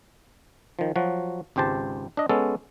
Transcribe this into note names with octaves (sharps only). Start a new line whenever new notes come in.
D#3 F3
F3 F#3 F#4
G#1 C#2 G4 C5 A5
D4 D#5
G#3 B3 C#4 A4